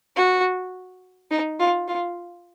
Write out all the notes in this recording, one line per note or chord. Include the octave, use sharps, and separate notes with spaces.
F#4
D#4
F4
F4